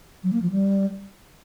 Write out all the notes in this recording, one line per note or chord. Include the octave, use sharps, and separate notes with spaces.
F#3
A#3
F3
G3